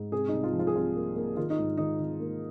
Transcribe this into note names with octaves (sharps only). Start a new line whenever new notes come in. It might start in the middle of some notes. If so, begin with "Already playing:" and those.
Already playing: G#2
C3 G#4
C2 D#4
F4
F3
F4
G#4
C2 F4
A#3
A#3
D#3 F4
D#4
G#2
D#3 D#4
D#3
A#3